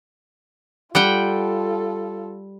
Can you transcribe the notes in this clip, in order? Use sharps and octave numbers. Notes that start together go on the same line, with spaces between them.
G3 F4 A4 F#5 G5